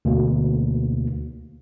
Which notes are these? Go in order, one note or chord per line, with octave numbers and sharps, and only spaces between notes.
D2 B2 A#3